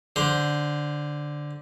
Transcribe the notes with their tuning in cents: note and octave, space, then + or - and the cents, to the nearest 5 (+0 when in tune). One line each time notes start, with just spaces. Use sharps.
D3 +0 C5 +0